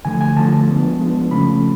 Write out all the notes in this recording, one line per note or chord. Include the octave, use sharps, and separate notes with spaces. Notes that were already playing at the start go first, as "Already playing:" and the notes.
D3 F3 A3 G#5
G#5
D3 F3 A3 A5
F3 G#3 B3 D4
F3 G#3 B3 D4
C#3 F3 A3 C#4 B5